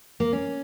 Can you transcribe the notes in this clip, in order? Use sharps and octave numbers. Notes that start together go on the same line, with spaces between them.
A#3
C#4